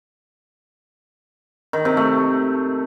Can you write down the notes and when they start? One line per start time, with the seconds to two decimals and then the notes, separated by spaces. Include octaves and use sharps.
1.73 D#3
1.85 C3
1.97 A3